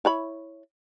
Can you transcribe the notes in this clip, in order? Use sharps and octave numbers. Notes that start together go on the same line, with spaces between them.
E4 C#5 B5